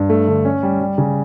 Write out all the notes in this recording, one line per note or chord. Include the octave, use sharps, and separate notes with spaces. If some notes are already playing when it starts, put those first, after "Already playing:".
Already playing: G2
A3
D3
C#4
G3
G3
C#3